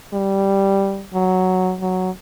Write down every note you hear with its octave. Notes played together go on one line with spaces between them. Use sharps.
G3
F#3
F#3